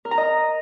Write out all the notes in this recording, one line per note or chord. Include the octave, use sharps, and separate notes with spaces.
A#4
A#5
D#5